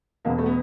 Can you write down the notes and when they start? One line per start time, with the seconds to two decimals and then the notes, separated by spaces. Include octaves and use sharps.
0.25 E1 E2 B2 A#3
0.38 A3
0.46 B3